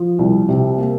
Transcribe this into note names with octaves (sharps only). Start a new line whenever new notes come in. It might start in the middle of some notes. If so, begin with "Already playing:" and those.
Already playing: F3
C2
C3
A#3